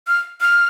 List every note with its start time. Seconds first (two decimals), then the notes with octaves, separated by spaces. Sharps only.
0.08 F6
0.41 F6